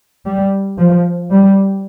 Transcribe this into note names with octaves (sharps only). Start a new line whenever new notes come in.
G3
F3
G3